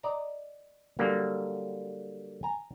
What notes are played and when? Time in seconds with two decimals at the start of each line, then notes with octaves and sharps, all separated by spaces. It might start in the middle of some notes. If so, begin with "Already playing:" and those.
0.03 D5 D#5 A#5
0.99 D3 F#3 G3 A#3
2.43 G#5 A#5